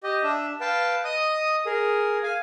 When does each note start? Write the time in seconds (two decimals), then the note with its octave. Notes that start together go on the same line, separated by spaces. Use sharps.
0.03 G4 D#5
0.23 D4 E5
0.60 B4 F5 G5 A5
1.05 D#5 D#6
1.66 G#4 A#4
2.23 F5 G#5